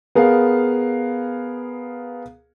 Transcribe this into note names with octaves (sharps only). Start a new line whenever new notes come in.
B3 G#4 A#4 F5